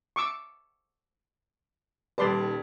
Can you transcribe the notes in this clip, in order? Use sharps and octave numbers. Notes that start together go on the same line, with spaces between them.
C#6 D6 E6
D#1 G3 B4 D5 A5 C6